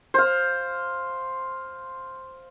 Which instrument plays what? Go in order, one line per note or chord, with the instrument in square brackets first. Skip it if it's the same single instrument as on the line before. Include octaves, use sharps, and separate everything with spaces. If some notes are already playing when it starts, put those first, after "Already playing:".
[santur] C5 F5